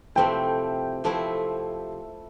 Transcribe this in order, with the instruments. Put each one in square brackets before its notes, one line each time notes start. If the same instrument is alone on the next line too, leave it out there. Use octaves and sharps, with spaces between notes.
[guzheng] C3 F3 A3 C4 E4 [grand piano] G5
[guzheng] C3 F3 A3 C4 E4